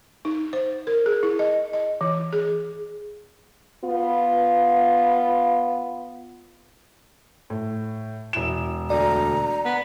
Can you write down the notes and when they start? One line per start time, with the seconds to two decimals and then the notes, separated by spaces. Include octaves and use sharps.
0.25 D#4
0.53 C5
0.87 A#4
1.06 G#4
1.23 E4
1.39 D#5
1.73 D#5
2.01 E3
2.33 G#4
3.84 B3 F4
7.50 A2
8.33 E1 E4 E7
8.90 D2 D5 A#5
9.65 B3